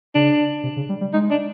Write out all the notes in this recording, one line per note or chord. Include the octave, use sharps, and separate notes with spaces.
C#3 D4
C3
C#3
G3
G3
G#3 D#4
D4